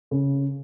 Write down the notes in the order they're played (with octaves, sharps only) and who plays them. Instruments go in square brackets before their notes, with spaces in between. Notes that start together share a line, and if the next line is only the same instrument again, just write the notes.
[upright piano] C#3